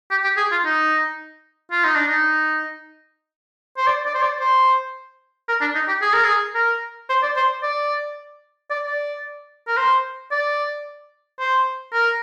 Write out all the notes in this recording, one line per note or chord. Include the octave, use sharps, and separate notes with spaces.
G4
G4
G#4
F4
D#4
F4
D#4
D4
D#4
C5
D5
D5
C5
D5
C5
A#4
D4
D#4
G4
G#4
A#4
G#4
A#4
C5
D5
C5
D5
D5
D5
A#4
C5
D5
C5
A#4